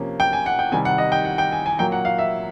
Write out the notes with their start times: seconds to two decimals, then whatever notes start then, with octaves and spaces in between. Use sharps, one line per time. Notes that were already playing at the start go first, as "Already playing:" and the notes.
Already playing: C3 F3 A#3 C#4
0.20 G5
0.33 G#5
0.46 F#5
0.59 G5
0.72 C3 D#3 G3 G#5
0.85 F#5
0.98 D#5
1.12 G5
1.25 F#5
1.38 G5
1.52 G#5
1.66 G#5
1.78 A#2 F#3 A#3 G5
1.92 F#5
2.05 F5
2.19 E5